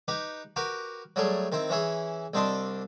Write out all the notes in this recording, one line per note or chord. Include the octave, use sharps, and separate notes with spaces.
D#4 G4 B4
F#4 G4 A#4 B4
F#3 G3 A3 G#4
D#3 C4 E4
E3 C#4 E4 G#4
C2 C4 D4 D#5 A5 C6